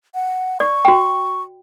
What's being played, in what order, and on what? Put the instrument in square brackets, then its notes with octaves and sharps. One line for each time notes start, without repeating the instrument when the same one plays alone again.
[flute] F#5
[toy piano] D5 [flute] C#6
[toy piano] F#4 G5